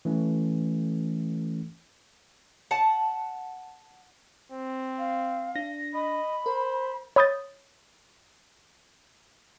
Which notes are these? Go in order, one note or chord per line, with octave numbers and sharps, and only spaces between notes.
E3 A3 C#4
F#5 A5
C4
F5
D4 A#6
D#5 B5
A#4 C5
C#5 B5 D#6 G6 A6